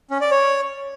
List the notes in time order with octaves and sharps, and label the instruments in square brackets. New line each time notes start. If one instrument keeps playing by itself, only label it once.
[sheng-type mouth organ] C#4
D5
C#5